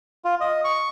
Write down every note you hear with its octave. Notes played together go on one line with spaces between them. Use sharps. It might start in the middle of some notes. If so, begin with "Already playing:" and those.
F4
D#5
C#6